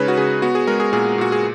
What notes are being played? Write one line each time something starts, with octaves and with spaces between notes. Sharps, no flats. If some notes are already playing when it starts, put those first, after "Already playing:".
Already playing: C#3 G#3 D#4 B4 C#5
F#4
C#3 G#4
B3 F#4
G#4
G#3 A#4
G#4
A#2 G#4
A#2 F#4
G#4